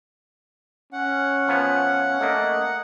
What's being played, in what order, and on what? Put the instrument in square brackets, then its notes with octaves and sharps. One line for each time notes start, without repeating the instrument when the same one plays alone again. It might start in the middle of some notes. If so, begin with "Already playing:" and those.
[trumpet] C#4 [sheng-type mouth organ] F#5
[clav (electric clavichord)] F3 B3 C#5
[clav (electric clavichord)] A3 A#3 [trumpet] D#5